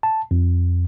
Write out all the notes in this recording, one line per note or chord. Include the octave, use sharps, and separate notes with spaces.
A5
F2